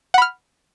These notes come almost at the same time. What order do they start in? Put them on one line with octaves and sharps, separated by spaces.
F#5 B5 F6